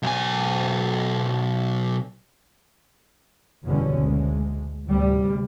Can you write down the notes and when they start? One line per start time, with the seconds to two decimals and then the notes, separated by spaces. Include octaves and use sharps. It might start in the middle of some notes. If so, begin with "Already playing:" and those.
0.03 B1 G#5
3.65 F#1 E2 B2 D3 G3 C#4
3.97 D2 G#3
4.86 A1 D2 C3 G3